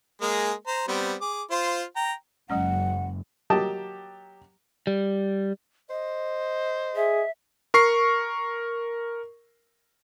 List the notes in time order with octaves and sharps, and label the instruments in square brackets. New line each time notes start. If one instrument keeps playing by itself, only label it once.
[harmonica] G#3 A#3 G#4
C5 A#5
G3 B3 C4
G#4 D6
F4 C5
G5 A#5
[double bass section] F#1 [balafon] F#3 G#3 C#4 [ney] F#5
[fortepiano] F#3 A#3 G4 D#5 A5
[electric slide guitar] G3
[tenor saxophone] C5 [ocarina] D#5
[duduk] G#4 [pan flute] E5
[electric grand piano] A#4 C#6 C7